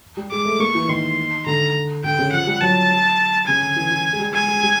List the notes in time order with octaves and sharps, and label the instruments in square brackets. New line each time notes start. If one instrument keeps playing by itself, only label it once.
[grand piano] G3
[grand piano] G#3 [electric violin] D6
[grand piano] A3
[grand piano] A#3 [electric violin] C#6
[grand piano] E3
[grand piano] D#3 [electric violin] C6
[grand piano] D3 [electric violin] A#5
[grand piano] D3 [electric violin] G5
[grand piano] C#3
[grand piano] F3 [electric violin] F#5
[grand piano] G3
[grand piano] F#3 [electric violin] A5
[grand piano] C#3 [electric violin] G#5
[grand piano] D3
E3
E3
G#3
G3
[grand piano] G#3 [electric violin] G#5
[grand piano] G#3
G3